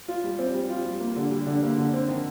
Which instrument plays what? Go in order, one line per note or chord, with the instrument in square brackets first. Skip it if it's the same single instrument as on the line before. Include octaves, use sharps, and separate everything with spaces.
[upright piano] F4
G3
C4
G3
F4
G3
A#3
D3
G3
D3
A#3
D3
C4
D#3